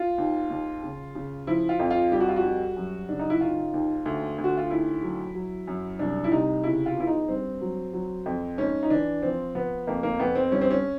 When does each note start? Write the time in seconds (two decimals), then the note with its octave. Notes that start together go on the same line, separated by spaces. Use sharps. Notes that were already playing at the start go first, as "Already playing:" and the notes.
Already playing: F4
0.18 D#2
0.51 D#2
0.83 C#3
1.15 C#3
1.47 F3 E4
1.69 F4
1.79 F2
1.91 F4
2.12 G3 G4
2.20 F#4
2.29 F4
2.36 F#4
2.44 G3
2.76 F#2
3.09 C#3 D4
3.20 D#4
3.30 E4
3.41 D#3 F4
3.74 D#2
4.06 D2
4.38 D2
4.44 F#4
4.57 F4
4.70 D#2 E4
5.03 F#3
5.35 F#3
5.67 F#2
5.99 C2 D4
6.24 E4
6.32 C3 D#4
6.64 C#3 E4
6.86 F4
6.97 E2 E4
7.07 D#4
7.28 G2 C4
7.61 F#3
7.93 F#3
8.26 F2
8.58 G#2 C#4
8.83 D#4
8.90 E3 D4
9.22 F3 C4
9.55 F3 B3
9.87 F2 A#3
10.03 A#3
10.20 F2 B3
10.35 C4
10.52 G2 C#4
10.61 C4
10.71 C#4